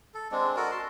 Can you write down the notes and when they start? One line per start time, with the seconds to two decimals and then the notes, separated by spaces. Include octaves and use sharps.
0.14 A4
0.32 G#3 C4 D4
0.56 F#4 A4 A#4
0.71 A5 C6